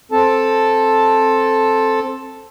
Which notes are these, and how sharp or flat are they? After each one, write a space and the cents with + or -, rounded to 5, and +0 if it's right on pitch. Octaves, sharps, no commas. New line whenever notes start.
C4 +10 A4 +0 A5 +0